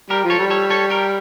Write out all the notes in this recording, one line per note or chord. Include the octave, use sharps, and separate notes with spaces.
G3 G4 A#4
F3
A4 C#5
G3
A4 C#5
A4 C#5
G4 A#4